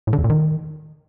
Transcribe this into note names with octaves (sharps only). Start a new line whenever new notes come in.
A2
D3
E2
A#2
D#3